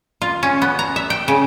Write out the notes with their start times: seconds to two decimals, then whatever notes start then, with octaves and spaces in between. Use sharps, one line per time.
0.22 F4
0.43 C#4
0.62 B3
0.79 A#5
0.96 E5
1.10 G5
1.28 C#3